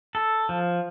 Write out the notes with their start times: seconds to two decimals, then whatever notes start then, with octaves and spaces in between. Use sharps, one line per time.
0.15 A4
0.49 F3